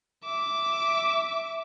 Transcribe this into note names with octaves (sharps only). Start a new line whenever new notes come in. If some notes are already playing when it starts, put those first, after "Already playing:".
E5 D6